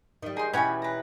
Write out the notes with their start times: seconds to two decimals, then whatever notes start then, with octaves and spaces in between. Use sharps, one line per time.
0.22 D#3 G3
0.37 D#4 G#4 C6
0.53 B2 E3 G3 C#4 C#5 F#5 G#5 B5
0.82 B4 A#5